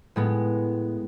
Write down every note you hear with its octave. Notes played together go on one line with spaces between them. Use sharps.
A2 G#3 B3